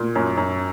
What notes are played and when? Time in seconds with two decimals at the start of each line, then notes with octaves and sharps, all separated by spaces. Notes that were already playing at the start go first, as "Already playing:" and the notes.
Already playing: A#2
0.15 F#2
0.37 F#2